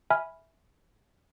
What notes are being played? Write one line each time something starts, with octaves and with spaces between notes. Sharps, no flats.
E5 G#5 B5 F6